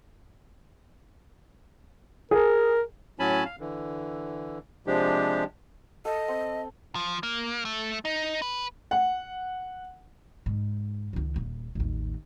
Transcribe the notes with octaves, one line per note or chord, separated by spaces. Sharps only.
G#4 A#4
A2 F#3 C#4 G#5 A5 B5
F5
D3 E3
C3 F3 G#3 D4 G4
A4 D#5 F5
C4
F3
A#3
A3
D#4
B4
F#5
G#2
C#2 D#3
D#1
A1 D#2